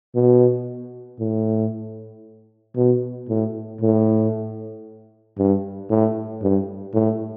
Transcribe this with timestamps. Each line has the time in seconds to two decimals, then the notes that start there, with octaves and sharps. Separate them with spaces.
0.15 B2
1.19 A2
2.76 B2
3.29 A2
3.81 A2
5.38 G2
5.90 A2
6.42 G2
6.94 A2